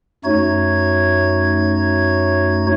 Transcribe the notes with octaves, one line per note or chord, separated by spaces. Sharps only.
F#2 A3 D#4 F#4 C#5 G#6